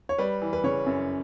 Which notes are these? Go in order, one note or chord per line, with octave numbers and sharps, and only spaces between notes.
C#5
G3 B4
E3
B4
C#3 C#5
F#2